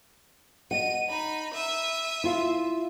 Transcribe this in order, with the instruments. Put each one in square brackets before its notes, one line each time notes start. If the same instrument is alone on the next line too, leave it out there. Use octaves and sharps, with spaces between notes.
[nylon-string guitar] D#5 F#5 [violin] D#7
[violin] D#4 B5
E5 D#6
[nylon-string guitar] E4 F4 F5